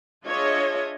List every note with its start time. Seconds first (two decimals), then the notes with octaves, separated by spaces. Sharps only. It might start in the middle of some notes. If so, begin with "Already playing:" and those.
0.25 D4 F4 G#4 C#5 D#5 E5